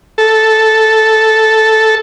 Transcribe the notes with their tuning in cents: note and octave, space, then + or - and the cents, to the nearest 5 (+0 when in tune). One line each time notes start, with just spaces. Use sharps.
A4 -5